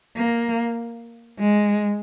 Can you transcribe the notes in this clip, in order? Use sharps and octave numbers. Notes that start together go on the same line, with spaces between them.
A#3
G#3